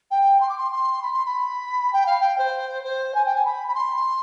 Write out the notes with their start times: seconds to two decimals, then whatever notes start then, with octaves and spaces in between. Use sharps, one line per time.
0.11 G5
0.40 C6
0.49 D6
0.58 C6
0.71 C6
1.02 B5
1.13 C6
1.25 B5
1.93 G5
2.06 F5
2.20 G5
2.38 C5
2.84 C5
3.14 G#5
3.25 G5
3.35 G#5
3.45 B5
3.67 B5
3.74 C6